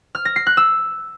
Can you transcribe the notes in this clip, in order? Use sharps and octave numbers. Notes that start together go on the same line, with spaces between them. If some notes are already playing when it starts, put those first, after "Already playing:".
F6
A#6
C7
F#6
E6